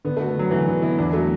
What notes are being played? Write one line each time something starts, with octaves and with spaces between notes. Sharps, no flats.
D3 B3
A3 F#4
B3
D3 F#3
E3 F#4
D3 B3
B3 E4
E2 D4
F#3 A3